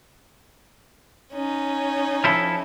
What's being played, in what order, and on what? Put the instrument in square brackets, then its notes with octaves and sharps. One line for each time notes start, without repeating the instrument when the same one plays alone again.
[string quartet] C#4 D#4
[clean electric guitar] F3 E4 A4